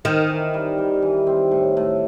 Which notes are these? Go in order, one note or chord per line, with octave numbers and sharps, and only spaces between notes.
D#3 C4
E3
G3
G3
E3
C4
A2
A2